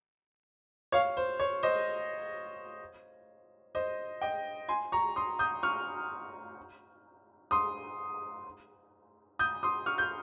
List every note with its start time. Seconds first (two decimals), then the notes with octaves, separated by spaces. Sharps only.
0.92 C#5 F5
1.17 C5
1.40 C#5
1.63 C5 D#5
3.75 C5 D#5
4.21 D#5 G5
4.68 G#5 C6
4.92 A#5 C#6
5.16 C6 D#6
5.39 D#6 G6
5.63 C#6 F6
7.51 C6 D#6
9.39 D#6 G6
9.63 C6 D#6
9.86 C#6 F6
9.98 G6